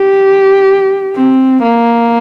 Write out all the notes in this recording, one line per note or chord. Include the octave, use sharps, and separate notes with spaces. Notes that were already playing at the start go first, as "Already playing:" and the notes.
Already playing: G4
C4
A#3